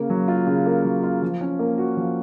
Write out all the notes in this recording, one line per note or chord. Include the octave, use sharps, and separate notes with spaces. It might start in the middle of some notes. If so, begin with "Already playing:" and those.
Already playing: C#3 A#3
F#3
F4
C#3
A#3
F#3
F4
F3
C#4
A#3
F#4
F3